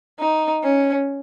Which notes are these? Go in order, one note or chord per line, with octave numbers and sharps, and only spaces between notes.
D#4
C#4